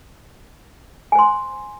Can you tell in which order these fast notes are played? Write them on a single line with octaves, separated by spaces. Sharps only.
G#5 C5 C6